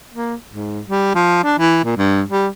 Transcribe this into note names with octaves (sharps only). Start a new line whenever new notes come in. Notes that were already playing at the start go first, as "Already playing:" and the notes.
A#3
G#2
G3
F3
D4
E3
A#2
G2
G3